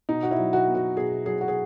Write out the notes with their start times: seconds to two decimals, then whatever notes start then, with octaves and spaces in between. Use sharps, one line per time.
0.09 B2 D#4
0.23 F#4
0.31 E4
0.38 F#3
0.53 F#4
0.67 B3
0.75 F#4
0.97 B2 G#4
1.26 F#3 G#4
1.41 F#4
1.48 G#4